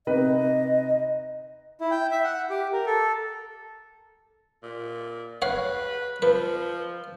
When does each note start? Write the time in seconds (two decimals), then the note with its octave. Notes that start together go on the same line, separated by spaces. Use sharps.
0.07 C3 D#4 B4 D#5
1.79 E4
1.91 G5
2.11 E5
2.24 F#5
2.50 G4
2.73 A#4
2.87 A4
4.63 A#2
5.42 B4 C#5 F5 F#5
6.22 F3 B4